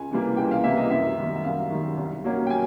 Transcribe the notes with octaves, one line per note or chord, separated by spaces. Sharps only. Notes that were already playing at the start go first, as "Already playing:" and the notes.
Already playing: C#2 G#5
C3 E3 G3 A#3
C#2 G5
F5
C3 E3 G3 A#3 E5
D#5
F#2 E5
D#3 G3
E5
F#2 F5
D#3 G3
C2
B2 F#3 A#3 C#4
G5
G#5